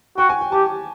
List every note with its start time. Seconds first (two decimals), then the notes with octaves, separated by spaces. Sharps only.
0.18 F#4 G5
0.29 G#5
0.41 G5
0.52 G4 A5